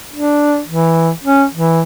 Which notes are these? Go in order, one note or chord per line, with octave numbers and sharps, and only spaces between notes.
D4
E3
C#4
E3